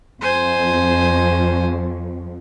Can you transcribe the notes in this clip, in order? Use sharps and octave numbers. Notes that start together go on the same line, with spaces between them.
F2 C5 G#5